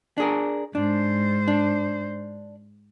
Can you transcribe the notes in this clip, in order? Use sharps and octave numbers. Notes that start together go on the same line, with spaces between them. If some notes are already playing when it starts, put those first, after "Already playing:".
D4 G#4 A#4
G#2 D4 C5
D4